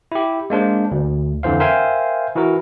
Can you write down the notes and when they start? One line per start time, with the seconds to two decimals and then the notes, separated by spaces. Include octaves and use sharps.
0.12 E4 G4
0.50 G#3 A#3 D4 C5
0.91 D2
1.43 F2 D3 E3 C5 F5
1.60 A#4 C5 E5 F5 G5 G#5
2.35 E3 E4 F#4 A#4